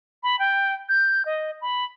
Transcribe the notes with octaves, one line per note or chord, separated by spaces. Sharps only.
B5
G5
G6
D#5
B5